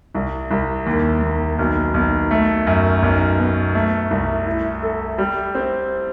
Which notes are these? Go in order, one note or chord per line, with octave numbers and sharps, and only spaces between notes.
C2
C2
D#2
D#2
B1
B1
A3
F#2
B1
B2
A3
C2
E4
A4
G3
C4